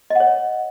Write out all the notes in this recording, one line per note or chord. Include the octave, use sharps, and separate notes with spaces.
C#5 D#5 F#5